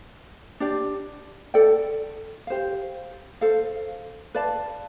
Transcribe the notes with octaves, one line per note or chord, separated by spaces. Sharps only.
D4 G4 D5
A4 D5 G5
G4 C5 F5
A4 C5 F5
B4 D5 F5 A5